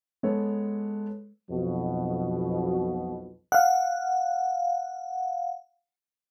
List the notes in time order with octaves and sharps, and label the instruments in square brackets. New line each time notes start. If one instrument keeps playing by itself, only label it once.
[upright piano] G#3 B3 A4 C#5
[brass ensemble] B1 F2 B2
[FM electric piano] F5 F#5